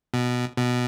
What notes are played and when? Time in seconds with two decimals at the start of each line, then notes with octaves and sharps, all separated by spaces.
0.14 B2
0.57 B2